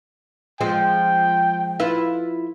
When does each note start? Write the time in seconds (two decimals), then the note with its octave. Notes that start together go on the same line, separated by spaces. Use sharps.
0.61 F3 G#3 C4 G5
1.80 E4 F4 B4